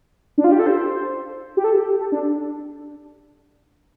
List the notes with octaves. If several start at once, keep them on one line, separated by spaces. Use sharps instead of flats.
D4
F4
G4
A4
C5
G4
A4
G4
A4
D4